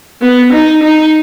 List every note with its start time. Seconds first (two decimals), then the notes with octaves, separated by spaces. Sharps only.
0.22 B3
0.53 D#4
0.83 D#4